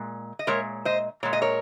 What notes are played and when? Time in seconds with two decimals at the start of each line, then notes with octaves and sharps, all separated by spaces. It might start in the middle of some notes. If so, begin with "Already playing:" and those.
Already playing: A#2 G#3
0.39 D#5
0.47 A#2 G#3 A#4 C#5
0.85 C5 D#5
1.23 A#2 G#3 C#5
1.33 D#5
1.42 A#4 C#5